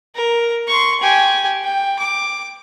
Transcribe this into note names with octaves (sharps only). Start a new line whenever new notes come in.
A#4
C6 C#6
G4 G#5
G5
D6